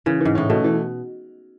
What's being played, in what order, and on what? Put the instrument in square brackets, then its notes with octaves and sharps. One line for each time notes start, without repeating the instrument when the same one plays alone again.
[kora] C#3 [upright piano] E3
[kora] G#2 [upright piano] E3
[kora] A2 [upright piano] C#4
[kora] B2 [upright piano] A3
[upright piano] E3